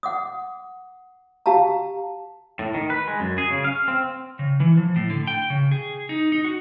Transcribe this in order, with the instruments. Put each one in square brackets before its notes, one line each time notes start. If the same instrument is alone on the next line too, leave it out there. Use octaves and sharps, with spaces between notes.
[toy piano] F#5 D6 D#6
G4 F5 A5 A#5
[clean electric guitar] A2
D#3
B4
G#3
F#2
G#4
C#3
F5
C4
[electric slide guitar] C#3
E3
F3
A2
D3
G5
C#3
G#4
D#4
D#4
F#4